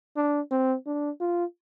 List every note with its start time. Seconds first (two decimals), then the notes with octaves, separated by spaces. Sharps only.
0.16 D4
0.51 C4
0.86 D4
1.20 F4